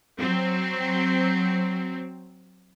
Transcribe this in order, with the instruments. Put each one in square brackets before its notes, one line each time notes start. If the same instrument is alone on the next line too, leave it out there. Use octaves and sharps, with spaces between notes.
[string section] F#3 C4